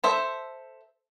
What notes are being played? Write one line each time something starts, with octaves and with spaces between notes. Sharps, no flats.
A4 C5 E5